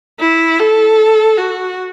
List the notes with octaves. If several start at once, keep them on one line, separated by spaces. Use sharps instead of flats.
E4
A4
F#4